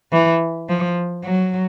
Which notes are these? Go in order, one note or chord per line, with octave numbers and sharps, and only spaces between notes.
E3
F3
F#3